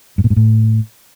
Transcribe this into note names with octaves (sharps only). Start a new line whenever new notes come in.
G2
A#2
G#2
A2